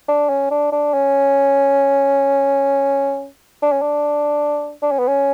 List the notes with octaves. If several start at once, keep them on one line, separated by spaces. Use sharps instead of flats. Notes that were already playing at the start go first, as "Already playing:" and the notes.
D4
C#4
D4
D4
C#4
D4
C#4
D4
D4
C#4
B3
C#4